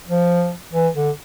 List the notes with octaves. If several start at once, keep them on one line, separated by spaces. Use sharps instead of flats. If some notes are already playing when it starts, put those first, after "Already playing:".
F3
E3
D3